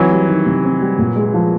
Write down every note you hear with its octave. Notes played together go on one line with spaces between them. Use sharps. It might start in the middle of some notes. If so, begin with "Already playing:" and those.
Already playing: E3 F#3 C4 D#4
G3
D#3
C3
C4
G3
A#2
G#3
F3